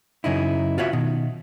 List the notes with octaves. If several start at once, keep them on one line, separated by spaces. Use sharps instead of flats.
F#2 C#3 D#4 E4
F4 F#4 C#5 E5
B2 D#3